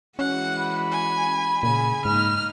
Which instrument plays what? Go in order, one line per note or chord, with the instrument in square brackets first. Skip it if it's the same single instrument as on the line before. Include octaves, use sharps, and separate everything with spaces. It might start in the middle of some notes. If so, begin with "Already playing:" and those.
[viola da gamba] E3 G#3 F#4 [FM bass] C#4 [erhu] F#5
[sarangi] B5
[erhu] G#5
[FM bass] A#2 [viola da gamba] C#3 [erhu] G#5
[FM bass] G#2 [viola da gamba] A#3 D#4 [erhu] F6